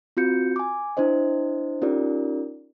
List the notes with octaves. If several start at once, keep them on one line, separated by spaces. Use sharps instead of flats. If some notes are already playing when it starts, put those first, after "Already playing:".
C4 F4 F#4 G6 C#7
G#5 D6
D4 E4 C5 D#5
C#4 D#4 F4 G4 A#4 D5